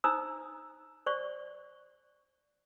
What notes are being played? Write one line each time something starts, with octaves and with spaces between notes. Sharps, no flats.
D4 D#4 C5 A#5 D#6 E6
C5 D5 C#6